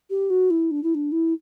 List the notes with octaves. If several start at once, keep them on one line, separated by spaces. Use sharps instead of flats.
G4
F#4
E4
D4
E4
D4
E4